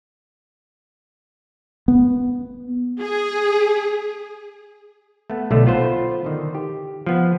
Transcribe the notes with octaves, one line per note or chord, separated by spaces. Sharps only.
B3
G#4
A3 B3
B1 D3 A3
B3 F4 B4 C5
D3 D#3
G4
F3 B3